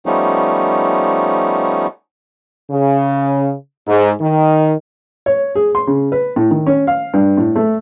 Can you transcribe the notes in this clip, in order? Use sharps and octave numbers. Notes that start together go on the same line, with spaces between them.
F3 G3 A3 B3 C#4 D#4
C#3
G#2
D#3
C#5
G#4
C6
C#3
B4
A2
D#3
C#4
F5
G2
A2
A3